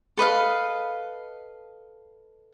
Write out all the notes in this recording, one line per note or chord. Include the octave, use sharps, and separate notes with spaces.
A4 B4 D#5 F5